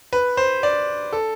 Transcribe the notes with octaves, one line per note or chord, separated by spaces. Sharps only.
B4
C5
D5
A4